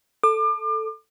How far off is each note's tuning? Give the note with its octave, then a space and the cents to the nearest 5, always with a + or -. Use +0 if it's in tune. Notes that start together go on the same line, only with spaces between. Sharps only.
A4 +0 D6 +35